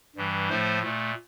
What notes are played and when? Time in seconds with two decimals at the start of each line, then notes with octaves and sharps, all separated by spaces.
0.16 G2 E3 G3
0.49 A2 F3 A3 C5
0.82 A#2 A3